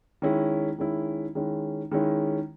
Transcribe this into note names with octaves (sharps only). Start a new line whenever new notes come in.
D#3 G#3 C#4 E4
D#3 G#3 C#4 E4
D#3 G#3 C#4 E4
D#3 G#3 C#4 E4